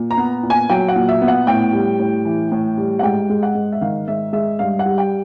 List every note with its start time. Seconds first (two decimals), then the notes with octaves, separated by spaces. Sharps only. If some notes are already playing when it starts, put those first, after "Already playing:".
Already playing: A#2
0.11 A#5
0.17 B3
0.43 A#2
0.50 G#5
0.70 F#3 G5
0.88 F#5
0.96 A#2
1.09 E5
1.22 B3
1.28 F#5
1.47 A2 G5
1.73 G3
1.99 A2
2.25 E3
2.52 A2
2.78 G3
2.99 F#5
3.03 G#2 G5
3.30 G#3
3.43 F#5
3.55 G#2
3.72 E5
3.81 D#3 F5
4.08 G#2 E5
4.33 G#3 E5
4.59 G2 F5
4.79 F#5
4.86 G3
4.98 G5